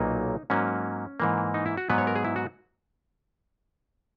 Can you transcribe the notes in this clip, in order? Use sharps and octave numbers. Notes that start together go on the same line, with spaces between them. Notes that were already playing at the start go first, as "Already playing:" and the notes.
Already playing: B1 A#2 F#3 A#3 D#4
G#2 F#3 A#3 C#4
G#2 E3 A#3
D#4
E4
F#4
G#2 F#3 B3 B4
C#5
A#4
G#4
E4
F#4